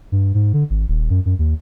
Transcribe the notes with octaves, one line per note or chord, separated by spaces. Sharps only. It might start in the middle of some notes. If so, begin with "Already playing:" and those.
G2
G#2
D3
G#1
D#1
F#2
F#2
D#2